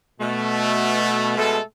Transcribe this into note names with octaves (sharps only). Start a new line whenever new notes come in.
B2 A3
B2 G#3 A3 A4